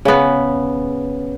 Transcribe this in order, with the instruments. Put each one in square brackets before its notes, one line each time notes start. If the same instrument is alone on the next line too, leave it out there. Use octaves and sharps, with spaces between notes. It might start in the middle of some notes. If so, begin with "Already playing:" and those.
[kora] C#3 B3